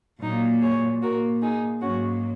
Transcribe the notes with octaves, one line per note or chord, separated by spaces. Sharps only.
A#2 F#3 A#3 D#4
G#4 C#5
A#2 A#3 F#4 A#4
D#4 G#4
G#2 F#3 A#3 C#4 F#4